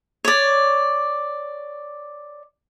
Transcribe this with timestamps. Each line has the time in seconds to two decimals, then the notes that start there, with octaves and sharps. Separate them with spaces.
0.25 C#5 D5